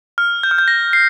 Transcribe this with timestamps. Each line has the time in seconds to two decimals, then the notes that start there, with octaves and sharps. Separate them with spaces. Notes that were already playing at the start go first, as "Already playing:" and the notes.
0.18 F6
0.43 G6
0.51 F6
0.58 G6
0.68 A#6
0.93 C7